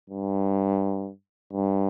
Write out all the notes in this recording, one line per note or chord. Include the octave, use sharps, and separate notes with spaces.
G2
G2